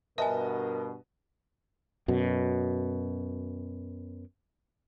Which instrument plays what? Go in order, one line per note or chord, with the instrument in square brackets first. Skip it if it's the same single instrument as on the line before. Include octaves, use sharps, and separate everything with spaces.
[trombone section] G2 B2 [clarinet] A#4 [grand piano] B4 D#5 A5 [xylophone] E5 G#5
[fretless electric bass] F#2 B2